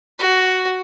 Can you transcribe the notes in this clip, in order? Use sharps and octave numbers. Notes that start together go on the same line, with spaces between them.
F#4